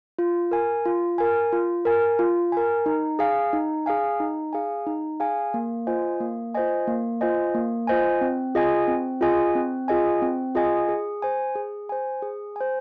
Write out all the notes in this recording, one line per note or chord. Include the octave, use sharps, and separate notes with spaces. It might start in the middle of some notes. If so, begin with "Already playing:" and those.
F4
A#4 G#5
F4
A#4 G#5
F4
A#4 G#5
F4
A#4 G#5
D#4
G#4 F5 G#5
D#4
G#4 F5 G#5
D#4
G#4 F5 G#5
D#4
G#4 F5 G#5
A#3
F4 C5 D#5 G#5
A#3
F4 C5 D#5 G#5
A#3
F4 C5 D#5 G#5
A#3
F4 C5 D#5 G#5
C4
F4 G#4 D#5 G#5
C4
F4 G#4 D#5 G#5
C4
F4 G#4 D#5 G#5
C4
F4 G#4 D#5 G#5
G#4
C5 G#5
G#4
C5 G#5
G#4
C5 G#5